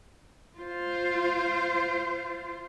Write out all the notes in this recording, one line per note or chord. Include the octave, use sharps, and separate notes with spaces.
F4 C5